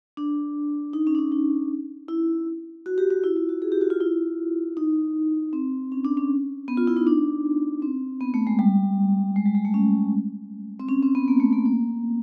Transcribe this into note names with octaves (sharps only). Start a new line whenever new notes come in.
D4
D#4
C#4
D4
C#4
D#4
E4
F#4
G4
F#4
E4
F4
F#4
G#4
G4
F#4
F4
E4
D#4
C4
C#4
D4
C#4
B3
F4
E4
D#4
D4
C4
B3
A3
G#3
G3
G#3
G3
G#3
A3
C#4
C4
C#4
C4
B3
A#3
A3
A#3
A#3